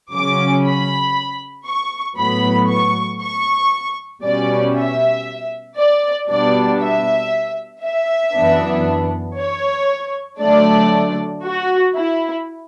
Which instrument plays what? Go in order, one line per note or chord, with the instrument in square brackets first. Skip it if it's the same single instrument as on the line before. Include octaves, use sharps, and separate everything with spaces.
[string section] C#3 F#3 C#4 D6
B5
C#6
A2 F#3 B3 B5
C#6
C#6
B2 G3 C#4 D5
E5
D5
B2 G3 B3 D4 D5
E5
E5
F#2 E3 B3 D4
C#5
D3 F#3 A3 D4 D5
F#4
E4